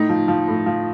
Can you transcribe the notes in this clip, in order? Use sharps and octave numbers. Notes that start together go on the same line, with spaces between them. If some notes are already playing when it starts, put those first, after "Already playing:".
Already playing: A2 D#4
F3
F3
A2
F3